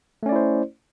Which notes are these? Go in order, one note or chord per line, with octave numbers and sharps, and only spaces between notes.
A3 C#4 E4 C5 D5